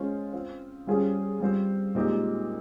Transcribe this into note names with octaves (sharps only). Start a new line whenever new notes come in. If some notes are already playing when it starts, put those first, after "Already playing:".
Already playing: G#3 C#4 F4 C5
C4 F4 C5
G3 C#4 F4 G#4 C5
G3 C4 F4 C5
A#2 G#3 C4 D#4 G4